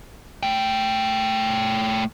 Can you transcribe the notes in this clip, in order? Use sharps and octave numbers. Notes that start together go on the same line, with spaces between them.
A3 G5